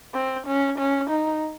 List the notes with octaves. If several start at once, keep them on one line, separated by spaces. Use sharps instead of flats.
C4
C#4
C#4
D#4